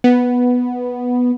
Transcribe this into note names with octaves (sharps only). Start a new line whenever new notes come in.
B3